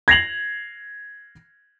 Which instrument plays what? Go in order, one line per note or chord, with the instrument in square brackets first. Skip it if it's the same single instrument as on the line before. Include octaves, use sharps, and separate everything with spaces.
[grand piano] G#6 A#6 C7 F7 F#7